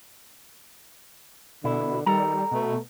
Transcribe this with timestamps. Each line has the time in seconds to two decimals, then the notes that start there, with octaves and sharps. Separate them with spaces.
1.64 B2 D3 E4
2.06 D#3 G3 A4 A#5
2.51 B2 A3